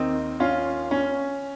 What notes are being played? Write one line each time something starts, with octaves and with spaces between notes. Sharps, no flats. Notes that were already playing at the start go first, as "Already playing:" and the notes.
Already playing: D#2 D#3 A#3 C4 D#4
C#4 F4
C#4